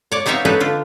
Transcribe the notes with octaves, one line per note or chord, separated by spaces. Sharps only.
C#5 D5
B3 C4 D#4 C#5 E5 F5
D4 D#4 A4 B4 C#5
D3 F4